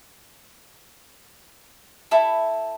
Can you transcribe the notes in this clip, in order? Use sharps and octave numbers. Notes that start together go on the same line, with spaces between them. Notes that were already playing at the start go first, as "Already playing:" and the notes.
E4 A4 E5 B5